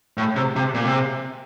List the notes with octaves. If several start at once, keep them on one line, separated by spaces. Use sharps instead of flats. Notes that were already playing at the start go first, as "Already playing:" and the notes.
A2
C3
C3
A#2
C3